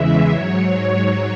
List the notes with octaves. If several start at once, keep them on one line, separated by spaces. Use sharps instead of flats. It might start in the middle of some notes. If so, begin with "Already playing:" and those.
Already playing: E2 C#3 E3 G#3 E5
G#2 F#3 C#5